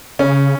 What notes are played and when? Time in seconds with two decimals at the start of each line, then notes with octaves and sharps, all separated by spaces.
0.19 C#3 C#4